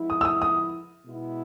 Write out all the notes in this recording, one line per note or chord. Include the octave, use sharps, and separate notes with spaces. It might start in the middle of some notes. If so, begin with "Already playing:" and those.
Already playing: F3 G#3 B3 E4
D#6
E6
D#6
D#6
B2 G#3 B3 E4